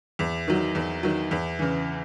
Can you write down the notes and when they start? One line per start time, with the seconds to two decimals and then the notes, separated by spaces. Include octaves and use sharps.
0.19 E2
0.48 D#3 F#3
0.75 E2
1.03 D#3 F#3
1.31 E2
1.59 C#3 E3